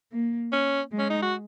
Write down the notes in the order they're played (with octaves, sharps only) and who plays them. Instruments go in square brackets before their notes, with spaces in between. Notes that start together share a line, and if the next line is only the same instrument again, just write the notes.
[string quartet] A#3
[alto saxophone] C#4
[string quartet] G#3
[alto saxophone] C#4
D#4
F#4